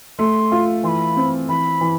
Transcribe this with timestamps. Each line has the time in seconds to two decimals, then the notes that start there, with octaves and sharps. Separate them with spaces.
0.19 A3 C6
0.52 F4
0.83 E3 C6
0.87 B5
1.16 C4
1.49 E3 B5
1.81 E3